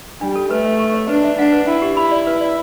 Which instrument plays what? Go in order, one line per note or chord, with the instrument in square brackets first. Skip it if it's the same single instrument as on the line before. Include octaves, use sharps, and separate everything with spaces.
[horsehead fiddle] G3 [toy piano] D4
[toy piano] A4
[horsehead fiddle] A3 [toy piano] B4
[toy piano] E5
C#6
C#5
[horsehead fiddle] D4 [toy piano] B4
[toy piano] E5
[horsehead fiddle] D4 [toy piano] F#5
[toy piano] B4
[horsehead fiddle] E4 [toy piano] G5
[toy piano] G4
[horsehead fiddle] E4 [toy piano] B5
[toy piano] D5
B4
D5